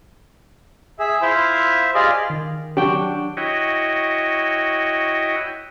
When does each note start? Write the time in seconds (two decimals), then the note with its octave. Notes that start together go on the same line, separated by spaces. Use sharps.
0.99 G#4 E5
1.22 E4 F4 C5 E5
1.95 F4 G4 G#4 D5 D#5 F5
2.30 D#3
2.77 F#3 D4 F#4 G4 G5
3.37 E4 F#4 C#5 D#5 G5